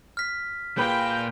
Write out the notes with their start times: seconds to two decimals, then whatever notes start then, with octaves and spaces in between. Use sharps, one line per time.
0.17 F6 B6
0.77 A#2 F4 G#4 B4 G5